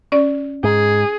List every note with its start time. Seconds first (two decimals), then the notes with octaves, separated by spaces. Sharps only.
0.12 C#4 D5
0.64 G#2 G#4